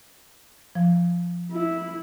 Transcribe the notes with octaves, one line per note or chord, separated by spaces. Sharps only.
F3
E4